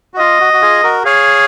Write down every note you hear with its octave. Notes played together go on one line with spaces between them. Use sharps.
F#4
F4 D#5
F#4
F#4
F4 G#4
F#4 A#4
G#4 C#5 F5